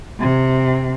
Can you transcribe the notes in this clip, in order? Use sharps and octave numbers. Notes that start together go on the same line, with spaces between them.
C3